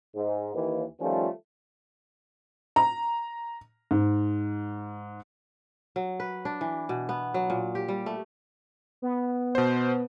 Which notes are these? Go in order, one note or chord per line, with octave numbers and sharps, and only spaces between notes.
G#2
D#2 E3
D#3 F3 G3 A3 C#4 F4
A#5
G#2
F#3
B4
D4
E3
B2
B3
F#3
A#2
G4
G3
A3
B3
B2 C5